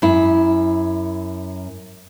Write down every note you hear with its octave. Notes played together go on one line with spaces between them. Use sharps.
F#2 E4